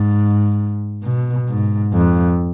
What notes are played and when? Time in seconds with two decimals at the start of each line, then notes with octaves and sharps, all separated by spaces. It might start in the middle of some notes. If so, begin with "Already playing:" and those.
Already playing: G#2
1.04 B2
1.49 G#2
1.93 F2